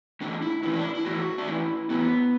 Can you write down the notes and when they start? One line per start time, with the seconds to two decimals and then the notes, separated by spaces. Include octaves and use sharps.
0.21 A2 E3 D4
0.42 E4
0.63 A2 E3 E4
0.74 D4
0.84 E4
0.95 E4
1.05 A2 E3 F#4
1.38 D4
1.47 A2 E3 E4
1.89 A2 E3 B3